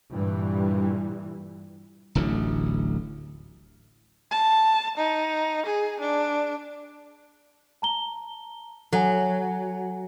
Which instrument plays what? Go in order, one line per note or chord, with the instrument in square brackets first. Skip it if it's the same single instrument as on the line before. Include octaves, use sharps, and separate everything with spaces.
[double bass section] G2 A#2 E3 G3
[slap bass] D1 A1 D3 F#3
[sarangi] A5
D#4
G#4
D4
[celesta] A5 A#5 G7
[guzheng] F#3 [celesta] A4 F#5 G#5